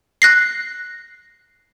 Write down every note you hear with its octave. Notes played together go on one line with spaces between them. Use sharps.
F#6 A#6 C7